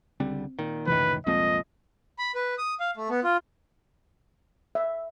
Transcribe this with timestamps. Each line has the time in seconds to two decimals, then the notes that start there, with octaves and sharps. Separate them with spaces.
0.20 C#2 D3 G3 C4
0.59 A#2 D#3
0.87 C#2 F#2 A2 C3 D#3 E3 B4
1.26 C2 F2 A#2 F3 G#3 C4 D#5
2.19 B5
2.35 B4
2.58 D#6
2.80 F5
2.97 A3
3.10 B3
3.24 F4
4.75 E5